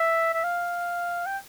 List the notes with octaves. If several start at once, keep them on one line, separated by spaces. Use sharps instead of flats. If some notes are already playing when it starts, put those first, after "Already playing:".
Already playing: E5
E5
F5
G5